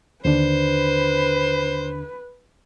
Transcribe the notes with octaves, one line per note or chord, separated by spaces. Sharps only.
D#2 D3 D4 B4 C5